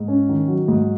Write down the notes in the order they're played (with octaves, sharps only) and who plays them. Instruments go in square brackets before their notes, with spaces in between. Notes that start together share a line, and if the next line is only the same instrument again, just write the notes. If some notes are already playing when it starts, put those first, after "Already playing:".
Already playing: [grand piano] G#2
C#4
D#3
F#3
G#2